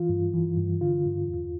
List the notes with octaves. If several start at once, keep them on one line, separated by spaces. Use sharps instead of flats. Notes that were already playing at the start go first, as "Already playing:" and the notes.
Already playing: E3 F4
G2
E3
G2
D3 F4
G2
E2